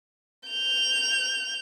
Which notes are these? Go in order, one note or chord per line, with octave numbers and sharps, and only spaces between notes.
G6 F7